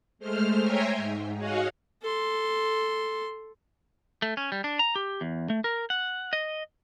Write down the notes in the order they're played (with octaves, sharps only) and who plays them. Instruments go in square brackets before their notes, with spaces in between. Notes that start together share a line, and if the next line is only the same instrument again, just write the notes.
[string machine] G#3 A3 C5 F6
C#5 E5 G5 G#5 A#5 C6
G#2
F#4 G#4 C#5 D#5 F5 F#5
[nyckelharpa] A4 C6
[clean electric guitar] A3
C#4
G3
D4
A#5
G4
E2
A3
A#4
F#5
D#5